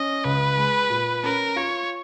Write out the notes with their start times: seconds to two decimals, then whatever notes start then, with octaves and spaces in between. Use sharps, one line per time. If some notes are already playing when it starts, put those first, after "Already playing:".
Already playing: C#4 D#5
0.24 C#2 B4
0.57 G#3
0.90 A#2
1.24 C#4 A#4
1.56 F4 C#5